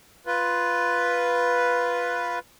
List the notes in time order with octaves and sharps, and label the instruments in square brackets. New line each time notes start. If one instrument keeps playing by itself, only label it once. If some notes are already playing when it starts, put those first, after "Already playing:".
[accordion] F4 B4